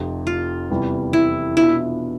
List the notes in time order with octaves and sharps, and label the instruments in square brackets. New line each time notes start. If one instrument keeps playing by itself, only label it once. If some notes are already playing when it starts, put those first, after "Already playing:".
Already playing: [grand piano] F1 F2 C3
[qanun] F4
[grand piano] E2 C3 E3 G3
[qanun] E4
[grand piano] B2 B3 D4 F4 [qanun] E4